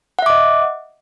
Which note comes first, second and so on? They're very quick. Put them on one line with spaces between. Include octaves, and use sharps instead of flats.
F#5 E5 D6 D#5